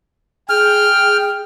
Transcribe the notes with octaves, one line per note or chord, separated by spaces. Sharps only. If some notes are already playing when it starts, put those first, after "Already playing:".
G#4 G5 F6